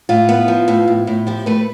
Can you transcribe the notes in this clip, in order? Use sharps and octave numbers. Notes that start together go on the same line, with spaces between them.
A2 F4
B3
F3
A2
A2
A2
F3 G4
A3 B4